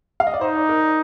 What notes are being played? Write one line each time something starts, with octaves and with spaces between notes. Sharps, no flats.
F5
D#5
D5
D#4 C5
D5
A#4